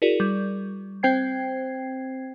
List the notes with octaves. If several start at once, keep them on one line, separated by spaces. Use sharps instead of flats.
E4 F#4 G#4 A#4 D5
G3
C4 C5 G5 G#6 C7